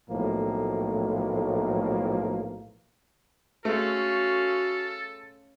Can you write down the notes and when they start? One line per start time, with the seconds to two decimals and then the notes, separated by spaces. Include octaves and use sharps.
0.10 B1 A2 F3 A3 A#3
3.65 G#3 A3 C#4 F#4 A4 F5